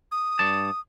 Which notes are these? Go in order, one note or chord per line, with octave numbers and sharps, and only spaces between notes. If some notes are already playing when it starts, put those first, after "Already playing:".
D#6
G2 D5 A5